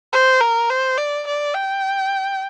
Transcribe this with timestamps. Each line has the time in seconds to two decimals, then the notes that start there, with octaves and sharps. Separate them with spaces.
0.13 C5
0.41 A#4
0.70 C5
0.98 D5
1.27 D5
1.54 G5